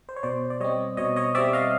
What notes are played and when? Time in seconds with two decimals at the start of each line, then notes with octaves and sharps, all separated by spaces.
0.09 C5
0.16 C#5
0.23 B2 C5 D5
0.50 D5
0.60 G3 C4 C#5 D#5
0.97 B2 C#5 D#5
1.16 C#5 D#5
1.35 G3 C4 D5 E5
1.53 D#5 F5